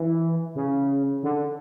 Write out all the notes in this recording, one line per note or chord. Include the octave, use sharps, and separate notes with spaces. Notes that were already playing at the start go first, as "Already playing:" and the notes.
Already playing: E3
C#3
D3